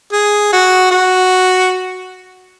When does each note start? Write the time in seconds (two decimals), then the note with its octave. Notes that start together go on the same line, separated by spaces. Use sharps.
0.13 G#4
0.52 F#4
0.91 F#4